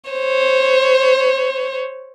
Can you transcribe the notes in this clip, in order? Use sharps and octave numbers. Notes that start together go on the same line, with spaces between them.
C5 C#5